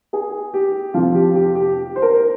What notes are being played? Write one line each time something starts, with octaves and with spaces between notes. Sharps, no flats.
G#4
G4
F2 C3 F3 F4
G4
G4
G4
C5
A#4